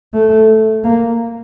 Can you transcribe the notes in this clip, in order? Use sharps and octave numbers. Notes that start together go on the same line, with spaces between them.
A3
A#3